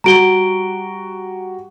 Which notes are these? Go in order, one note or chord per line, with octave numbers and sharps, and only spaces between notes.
G3 F#4 A#5 D7 G7